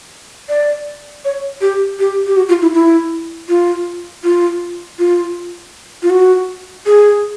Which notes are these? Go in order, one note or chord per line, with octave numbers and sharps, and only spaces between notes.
D5
C#5
G4
G4
G4
F#4
F4
E4
E4
F4
F4
F4
F4
F#4
G#4